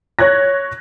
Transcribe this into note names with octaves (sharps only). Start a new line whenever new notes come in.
C#5 F#6 G#6 A#6